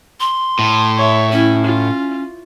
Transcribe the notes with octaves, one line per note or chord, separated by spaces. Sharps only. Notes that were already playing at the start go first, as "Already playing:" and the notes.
C6
A2
C#5 E5
C#4 E4
F4